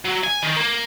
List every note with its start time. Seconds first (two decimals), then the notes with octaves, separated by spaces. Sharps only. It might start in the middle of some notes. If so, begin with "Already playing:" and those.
0.05 F#3
0.24 G#5
0.43 D#3
0.56 A#3